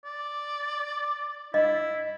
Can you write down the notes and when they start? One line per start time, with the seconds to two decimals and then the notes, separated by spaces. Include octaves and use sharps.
0.05 D5
1.54 E4 D#5